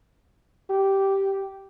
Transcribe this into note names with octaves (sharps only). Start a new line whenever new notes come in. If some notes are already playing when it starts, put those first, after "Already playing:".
G4